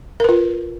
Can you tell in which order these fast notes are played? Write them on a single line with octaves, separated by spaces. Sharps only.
A#4 B4 F4